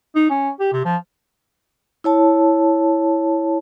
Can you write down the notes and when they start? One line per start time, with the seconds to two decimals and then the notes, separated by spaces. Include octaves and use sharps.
0.15 D#4
0.30 C#4
0.60 G4
0.73 C3
0.85 F3
2.04 E4 C#5 A5